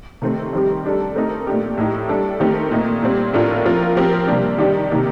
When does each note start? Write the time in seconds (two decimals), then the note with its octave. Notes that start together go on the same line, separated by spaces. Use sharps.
0.22 C3 D#3 A3 C4
0.53 D#3 G3 C4 G4
0.84 G3 D4 A4
1.15 A3 C4 D#4 A#4
1.47 A#2 A3 D4 G4
1.78 A2 A3 D#4 G4
2.09 G3 D4 A4
2.40 D#3 A3 C4 G4 A#4
2.71 A#2 A3 D#4
3.02 A#2 G3 C4
3.34 A2 A3 D4 F4 A#4
3.65 F3 C4 F4 A#4
3.96 F3 C4 G4 A#4
4.28 C3 G3 A#3 D4
4.58 D#3 G3 D4 G4
4.91 C3 D#3 A#3